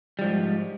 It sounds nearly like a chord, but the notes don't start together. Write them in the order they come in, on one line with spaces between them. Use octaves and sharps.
G3 F3 G#2